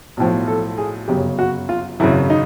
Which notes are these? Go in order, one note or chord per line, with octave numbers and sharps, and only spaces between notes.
B1 A2 F3
A4
G#4
G1 F#2 C#3 G4
F#4
F4
G#1 F#2 C#3 E4
D#4